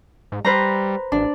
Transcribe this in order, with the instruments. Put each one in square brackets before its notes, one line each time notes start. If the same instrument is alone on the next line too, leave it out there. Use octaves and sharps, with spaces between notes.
[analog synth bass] G#2
[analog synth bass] G3 [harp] B4 C5 A#5
[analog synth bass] A1 [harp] D4